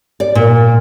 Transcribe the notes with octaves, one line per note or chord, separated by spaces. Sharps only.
D5
A#2